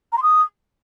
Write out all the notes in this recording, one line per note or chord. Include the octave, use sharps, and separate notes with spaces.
A#5
C6
D#6